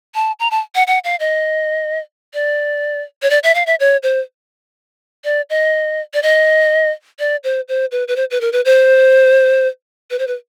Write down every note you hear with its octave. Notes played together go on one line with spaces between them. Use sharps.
A5
A#5
A5
F#5
F#5
F5
D#5
D5
C#5
D5
E5
F5
E5
C#5
C5
D5
D#5
D5
D#5
D5
C5
C5
B4
B4
C5
B4
A#4
B4
C5
B4
C5
B4